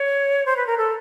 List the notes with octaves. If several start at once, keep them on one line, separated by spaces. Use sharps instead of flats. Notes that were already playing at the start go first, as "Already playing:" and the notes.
Already playing: C#5
C5
B4
A#4
A4